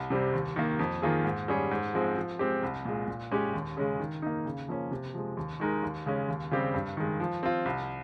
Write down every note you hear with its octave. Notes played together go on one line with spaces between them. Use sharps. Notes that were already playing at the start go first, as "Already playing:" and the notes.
Already playing: C2
C3 G3 C4
D#2
D#3 A#3
F2
D#3 A#3 F4 G#4
G#2
G3 C#4 G#4 C#5
G#2
F3 G#3 C4
F3
G#3 C4 G4
C2
A#2 G#3
A#2
G#3 C#4 G4 C#5
D#2
C#3 G#3 C#4 G#4
D#3
A#3 D#4
C#3
F3 A#3 C#4
C3
F3 G#3
D#2
D#3 G#3 D#4 A#4
D#2
C#3 G#3 C#4
D#2
C#3 G3 C4 G4
G2
D#3 G#3
F3
C4 F4
C2